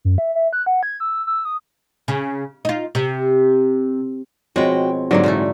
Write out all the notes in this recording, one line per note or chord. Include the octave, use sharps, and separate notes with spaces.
F#2
E5
E5
F#6
F#5
G#6
E6
E6
D#6
C#3
D#4 F4
C3
B2 F3 G#3 C4 F#4 C#5 G5
G#2 D3 F#3 G3 A3 A#3
A#2 E3 G#3 A3